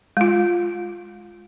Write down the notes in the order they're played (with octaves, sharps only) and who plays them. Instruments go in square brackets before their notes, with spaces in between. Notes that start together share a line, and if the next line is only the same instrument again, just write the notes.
[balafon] G#3 F4